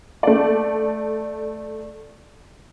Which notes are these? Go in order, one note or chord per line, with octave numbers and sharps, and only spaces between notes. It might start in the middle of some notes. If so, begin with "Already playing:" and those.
A3 D5